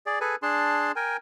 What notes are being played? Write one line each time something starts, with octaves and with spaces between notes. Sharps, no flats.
G#4 D5
G#4 A4 B4 G#5
D4 G#4 A5 C6
A#4 G5 G#5